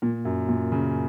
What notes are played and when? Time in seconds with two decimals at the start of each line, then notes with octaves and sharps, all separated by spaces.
0.02 A#2
0.25 F#2
0.48 A#2
0.72 C#3